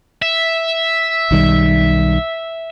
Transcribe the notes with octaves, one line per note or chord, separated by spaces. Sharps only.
E5
B1 D#3 G3